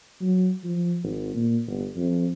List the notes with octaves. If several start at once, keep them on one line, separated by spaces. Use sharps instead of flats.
F#3
F3
G#1
A#2
G1
F2